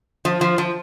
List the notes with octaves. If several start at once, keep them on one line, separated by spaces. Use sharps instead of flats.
F3
F3
F3